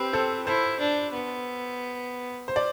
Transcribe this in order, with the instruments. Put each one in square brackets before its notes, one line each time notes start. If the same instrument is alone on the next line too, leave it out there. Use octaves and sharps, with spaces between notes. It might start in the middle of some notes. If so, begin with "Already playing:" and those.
Already playing: [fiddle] C4 [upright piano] G4 B4
[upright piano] A4 C5
[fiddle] E4 [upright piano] A4 C5
[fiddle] D4
B3
[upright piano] C5
D5